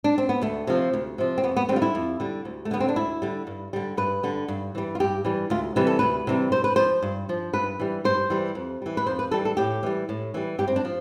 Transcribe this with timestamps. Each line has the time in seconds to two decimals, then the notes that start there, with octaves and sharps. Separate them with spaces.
0.04 D4
0.18 C4
0.29 B3
0.41 D2 A3
0.67 C3 F3
0.93 D2
1.18 C3 F3
1.38 C4
1.44 F2 B3
1.56 B3
1.69 D3 C4
1.72 G3 F4
1.82 E4
1.95 F2
2.20 D3 G3
2.45 D2
2.65 A3
2.71 D3 G3 B3
2.80 C4
2.88 D4
2.96 D2 E4
3.22 D3 G3
3.47 G2
3.73 D3 G3
3.97 G2 B4
4.23 D3 G3
4.48 G2
4.75 E3 G3
4.95 F4
5.00 G2 G4
5.25 E3 G3
5.50 D2 F4
5.76 C3 E3 G3 B4
5.87 A4
5.99 D2 B4
6.27 C3 E3 G3
6.52 G2 C5
6.64 B4
6.76 F3 C5
7.02 G2
7.29 F3
7.53 G2 B4
7.79 E3 G3
8.04 G2 C5
8.30 E3 G3
8.55 F2
8.82 E3 G3
8.97 B4
9.06 F2 C5
9.19 B4
9.31 E3 G3 A4
9.45 A4
9.57 A2 G4
9.83 E3 G3
10.09 A2
10.34 E3 G3
10.58 G2 G4
10.68 C4
10.76 D4
10.85 F3